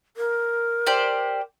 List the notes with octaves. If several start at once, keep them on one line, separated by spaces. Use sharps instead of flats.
A#4
G4 C5 D5